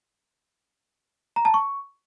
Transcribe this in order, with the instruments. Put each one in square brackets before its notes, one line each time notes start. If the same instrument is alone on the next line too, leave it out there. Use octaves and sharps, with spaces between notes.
[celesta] A#5
A5
C#6